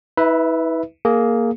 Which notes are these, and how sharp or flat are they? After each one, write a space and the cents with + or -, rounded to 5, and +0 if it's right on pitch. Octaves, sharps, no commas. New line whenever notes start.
E4 -40 B4 +0 E5 +0
A#3 +0 G#4 +15